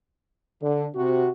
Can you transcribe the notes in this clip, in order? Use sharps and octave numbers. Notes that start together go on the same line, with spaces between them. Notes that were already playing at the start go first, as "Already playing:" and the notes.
D3
C3 F#4